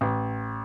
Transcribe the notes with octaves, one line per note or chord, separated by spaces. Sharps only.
A1